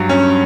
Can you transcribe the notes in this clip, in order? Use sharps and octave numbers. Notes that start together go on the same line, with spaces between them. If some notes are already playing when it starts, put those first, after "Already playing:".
Already playing: G2 F#3
C#4